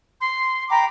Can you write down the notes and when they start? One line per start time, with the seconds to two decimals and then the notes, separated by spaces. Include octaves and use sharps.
0.20 C6
0.70 G5 A#5 B5 D6